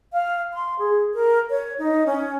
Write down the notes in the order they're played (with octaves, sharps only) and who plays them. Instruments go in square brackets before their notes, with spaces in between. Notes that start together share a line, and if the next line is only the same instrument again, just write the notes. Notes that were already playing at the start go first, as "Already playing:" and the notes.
[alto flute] F5
C6
G#4
A#4
C#5
D#4
C#4